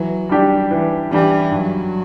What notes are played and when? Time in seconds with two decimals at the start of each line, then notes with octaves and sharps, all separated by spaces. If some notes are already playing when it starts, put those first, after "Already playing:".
Already playing: E3 F#3
0.29 G3 D4 G4
0.71 E3
1.11 E3 G3 D4 G4
1.51 G2 F#3